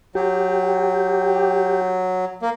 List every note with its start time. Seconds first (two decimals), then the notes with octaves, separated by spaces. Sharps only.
0.15 F#3 G4
2.42 A#3